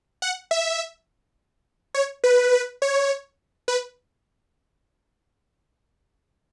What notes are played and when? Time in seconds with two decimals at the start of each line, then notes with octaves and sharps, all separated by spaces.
0.22 F#5
0.51 E5
1.94 C#5
2.24 B4
2.53 B4
2.82 C#5
3.68 B4